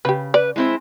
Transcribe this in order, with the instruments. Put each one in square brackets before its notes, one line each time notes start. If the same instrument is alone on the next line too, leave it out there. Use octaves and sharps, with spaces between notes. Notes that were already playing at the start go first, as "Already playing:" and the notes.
[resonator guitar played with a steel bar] C#3 [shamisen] G4 B4
[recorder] B4 [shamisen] D5
[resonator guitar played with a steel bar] G#3 C4 C5 [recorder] E4